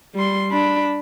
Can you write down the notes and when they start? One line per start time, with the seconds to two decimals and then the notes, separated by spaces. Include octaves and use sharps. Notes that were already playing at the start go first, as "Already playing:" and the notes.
0.15 G3 C6
0.51 D4 B5